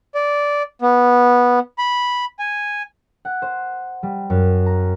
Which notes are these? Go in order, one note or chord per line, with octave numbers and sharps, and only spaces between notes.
D5
B3
B5
G#5
F#5
C5
G3
F#2
A#5